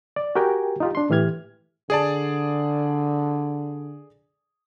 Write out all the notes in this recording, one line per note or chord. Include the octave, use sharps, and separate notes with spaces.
D5
F#4 G4 A#4 G5 G#5
D#4 F4 G4
D4 C6
A2 E3 G4 F6 G#6
D3 G#4 D5 A5